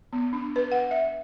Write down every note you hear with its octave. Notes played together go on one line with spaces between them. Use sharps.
B3
D4
B4
F#5
E5